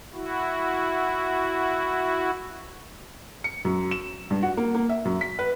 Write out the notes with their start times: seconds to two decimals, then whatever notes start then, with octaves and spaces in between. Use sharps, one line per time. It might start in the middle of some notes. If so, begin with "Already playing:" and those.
0.14 E4 F#4
3.44 C#7
3.65 F#2
3.91 E7
4.31 G2
4.43 F#4
4.57 A#3
4.75 A#3
4.89 E5
5.05 F#2
5.21 B6
5.39 B4